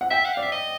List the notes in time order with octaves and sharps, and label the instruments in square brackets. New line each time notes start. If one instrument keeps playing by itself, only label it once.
[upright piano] F#5
[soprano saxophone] E5 [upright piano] G5
[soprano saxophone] F#5
[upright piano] D5 [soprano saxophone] F5
[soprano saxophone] E5
D#5